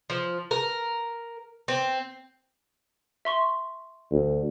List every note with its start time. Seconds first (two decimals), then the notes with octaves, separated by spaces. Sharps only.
0.10 F3
0.51 A#4
1.68 C4
3.25 E5 C6 C#6
4.11 D2